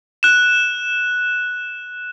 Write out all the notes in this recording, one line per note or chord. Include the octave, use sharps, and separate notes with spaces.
F#6 E7